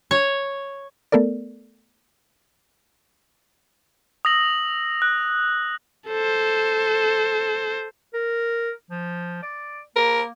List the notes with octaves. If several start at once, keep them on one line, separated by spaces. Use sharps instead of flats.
C#5
A3 B3 A4 A#4 D5
D#6 E6 A#6 F#7
F#6
A4 C5
A#4
F3
D5
A#3 A#4